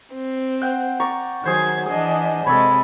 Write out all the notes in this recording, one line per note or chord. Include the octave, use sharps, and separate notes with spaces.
C4
F#5 G5
D5 A#5 C#6
D#3 F#3 G#4 C5 F#5 G#6
E3 D4 G#4 D#5
C3 G#3 A4 C#5 B5